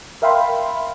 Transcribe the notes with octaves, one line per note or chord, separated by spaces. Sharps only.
A#4 E5 F5 G5 B5 C6